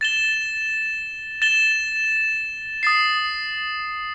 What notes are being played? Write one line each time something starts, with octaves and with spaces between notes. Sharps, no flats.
A6 E7 G7
A6 E7 G7
D#6 A6 C7